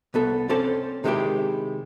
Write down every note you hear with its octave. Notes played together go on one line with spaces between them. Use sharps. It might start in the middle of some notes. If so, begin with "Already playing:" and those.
C2 B3 A4
C4 C#4 A4 D5 A5
C3 D#3 G#3 C#4 E4 G4